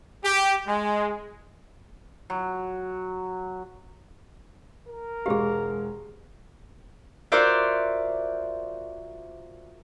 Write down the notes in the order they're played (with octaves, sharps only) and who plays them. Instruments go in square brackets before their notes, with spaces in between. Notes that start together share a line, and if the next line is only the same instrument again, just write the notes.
[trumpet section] G4
G#3
[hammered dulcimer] F#3
[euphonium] A#4
[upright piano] E1 G#3 F5 [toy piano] G4 G#4
[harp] F4 F#4 A#4 C5 D5 E5